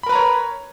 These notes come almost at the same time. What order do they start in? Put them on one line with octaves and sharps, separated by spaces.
B5 A#4 B4 A#5 C#5